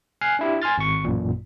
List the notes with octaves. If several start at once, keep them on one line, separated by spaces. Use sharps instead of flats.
G#5 F6 F#6 C7
D4 E4 G4
G#5 C6 F6 A6
G#1 C#6
A1 F#2 A#2